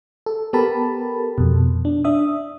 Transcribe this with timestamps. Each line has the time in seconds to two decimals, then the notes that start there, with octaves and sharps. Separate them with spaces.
0.26 A4
0.53 B3 G4 A4 A#4 A5 B5
1.38 F2 B2
1.85 D4
2.04 D4 E5 D#6